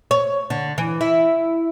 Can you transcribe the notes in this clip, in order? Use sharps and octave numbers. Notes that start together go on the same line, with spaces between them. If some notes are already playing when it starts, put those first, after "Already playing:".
C#5
D3
E3
E4